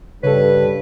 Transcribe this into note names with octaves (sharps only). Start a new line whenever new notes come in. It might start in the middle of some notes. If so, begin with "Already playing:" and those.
G2 C#3 A4 B4 C#5